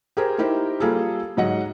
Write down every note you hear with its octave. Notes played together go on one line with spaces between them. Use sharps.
G4 G#4 A#4 C5
D#4 E4 G4 A#4 C5
G3 A#3 F4 G#4 A4
G#2 F#3 D#5 F#5